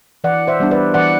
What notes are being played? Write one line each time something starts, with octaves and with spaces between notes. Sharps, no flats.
E3 D5 F#5
C5 E5
G3 B3 D4
B4 D5
E3 D5 F#5